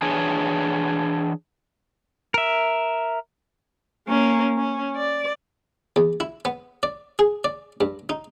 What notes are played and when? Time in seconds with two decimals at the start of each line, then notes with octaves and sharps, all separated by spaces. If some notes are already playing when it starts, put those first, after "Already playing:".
0.02 E3 D4 G#4 C#5
2.34 A#4 E5
4.07 A#3 C#4
4.58 C#4
4.96 D5
5.96 E2
6.20 E4
6.45 B3
6.83 D5
7.19 G#4
7.44 D5
7.81 G2
8.09 D#4